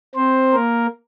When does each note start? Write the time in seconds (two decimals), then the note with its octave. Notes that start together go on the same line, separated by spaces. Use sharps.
0.15 C4 C5
0.53 A#3 A#4